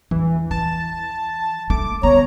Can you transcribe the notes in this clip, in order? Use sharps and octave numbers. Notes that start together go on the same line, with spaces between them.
E2 E3
E3 A5
A3 D6
D3 B3 C#5 A#5